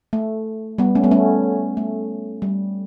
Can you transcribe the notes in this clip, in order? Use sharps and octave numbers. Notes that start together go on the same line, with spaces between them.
A3
G3 B3
A3 C#4
G3 B3
A3 C#4
A3
G3